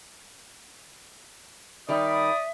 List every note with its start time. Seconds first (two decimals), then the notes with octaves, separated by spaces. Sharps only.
1.88 D#3 G3 D5 E5 D#6